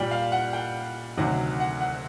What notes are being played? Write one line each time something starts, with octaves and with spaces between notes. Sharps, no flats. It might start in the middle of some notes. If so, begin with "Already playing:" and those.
Already playing: A#2 G3 G5
F5
F#5
G5
D2 C3 D#3 F#3 F#5
F#5
F#5